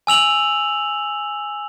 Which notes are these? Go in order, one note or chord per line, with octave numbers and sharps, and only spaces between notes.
G#5 E6 F7 F#7